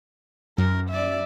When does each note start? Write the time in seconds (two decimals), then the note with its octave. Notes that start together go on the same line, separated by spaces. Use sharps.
0.58 F#2 A#4
0.90 D5 E5